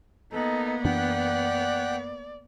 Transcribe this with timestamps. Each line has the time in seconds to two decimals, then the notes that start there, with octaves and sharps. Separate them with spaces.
0.33 A#3 B3 D#4 A4
0.84 F#2 E3 D4 D5 F#5 G5 F#6